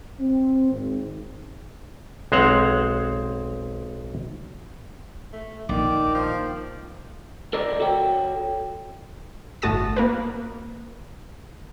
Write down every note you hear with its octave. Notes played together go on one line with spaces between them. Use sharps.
C4
G#1
B1 G#3 C4 C5 C#5 F#5
A3
A#1 D#3 D5
F3
A4 A#4 C5 D5 D#5 A#5
F#4 A4 C#5 G5
G1 A2 F#4 A5 D#6 A#6
A#3 A#4 B4